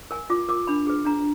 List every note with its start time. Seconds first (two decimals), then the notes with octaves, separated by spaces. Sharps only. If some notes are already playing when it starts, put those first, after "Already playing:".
0.11 A#4 G#5
0.30 F4 D6
0.49 A#4 D6
0.67 D4 B5
0.87 G#4 B4
1.05 D4 A#5